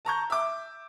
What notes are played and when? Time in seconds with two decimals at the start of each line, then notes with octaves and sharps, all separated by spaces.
0.05 A5 A#5 C#6 G6
0.30 E5 D6